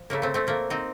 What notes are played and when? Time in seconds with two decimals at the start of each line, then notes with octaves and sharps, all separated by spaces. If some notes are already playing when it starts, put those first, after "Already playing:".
Already playing: F3
0.10 C#3 A3 A#3
0.22 A3 C4
0.34 A3 C4
0.47 A#2 A3 A#3
0.70 C4 D#4